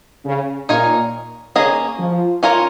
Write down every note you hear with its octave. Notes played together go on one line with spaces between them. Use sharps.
C#3
A#2 D#4 A#4 C#5 F5
C#3 A#3 C#4 G#4 D#5
F3
C#4 F4 A#4 C#5